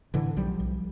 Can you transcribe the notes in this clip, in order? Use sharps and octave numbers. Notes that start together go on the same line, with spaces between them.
A2 D3 E3
B1 F3 G3
B1